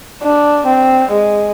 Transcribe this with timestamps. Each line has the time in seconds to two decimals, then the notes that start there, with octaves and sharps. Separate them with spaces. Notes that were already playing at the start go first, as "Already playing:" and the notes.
0.23 D4
0.66 C4
1.11 G#3